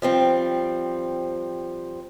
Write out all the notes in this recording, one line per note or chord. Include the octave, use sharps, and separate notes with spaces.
F3 G3 C4